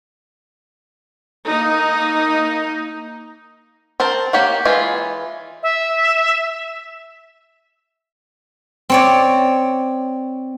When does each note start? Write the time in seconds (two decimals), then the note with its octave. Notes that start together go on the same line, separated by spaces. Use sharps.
1.46 A#3 D#4
4.00 C4 A#4 C5 A5
4.33 A#3 G4 C#5 F#5
4.65 E3 G#3 F4
5.62 E5
8.90 C4 C#5 D5